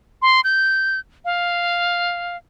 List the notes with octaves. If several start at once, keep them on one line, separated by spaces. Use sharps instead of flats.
C6
G6
F5